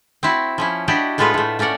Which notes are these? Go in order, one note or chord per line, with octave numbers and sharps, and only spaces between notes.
C4 E4 F#4
F3 C#4 E4
D4 E4 F#4 G4 D#5
A2 G#3 B3 F4 A4 B4
A2 A3
A3 C#4 A#4 D5 F#5